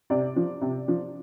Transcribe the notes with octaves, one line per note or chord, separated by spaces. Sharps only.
C3 D5
F3
C3
F3